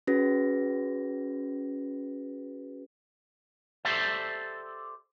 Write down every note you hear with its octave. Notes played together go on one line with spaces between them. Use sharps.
C#4 F#4 G#4 B4 A#6
G4 A4 C5 D5 E5